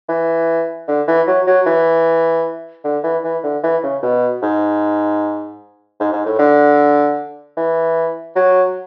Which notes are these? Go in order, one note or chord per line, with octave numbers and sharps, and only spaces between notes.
E3
D3
E3
F#3
F#3
E3
D3
E3
E3
D3
E3
C#3
B2
G#2
G#2
G#2
A2
D3
E3
F#3